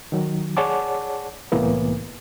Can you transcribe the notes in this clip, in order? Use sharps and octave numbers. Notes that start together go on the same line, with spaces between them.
D#3 F#3
G#4 C#5 D5 F#5 A5 D6
C2 A2 E3 A#3 B3